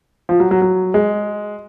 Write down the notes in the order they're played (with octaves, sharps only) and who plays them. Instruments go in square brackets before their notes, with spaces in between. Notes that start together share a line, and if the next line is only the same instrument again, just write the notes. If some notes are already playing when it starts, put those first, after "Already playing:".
[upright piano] F3
F#3
F#3
F#3
G#3